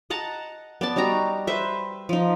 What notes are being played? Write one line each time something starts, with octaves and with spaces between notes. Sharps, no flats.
D#5 F#5 A5 A#5
B3 D5 A5
G3 D#4 F#4 A#5
B4 C5 E5
F3 D#4